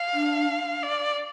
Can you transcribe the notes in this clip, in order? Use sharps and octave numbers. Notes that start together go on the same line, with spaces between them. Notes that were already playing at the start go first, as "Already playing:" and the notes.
Already playing: F5
D4
D5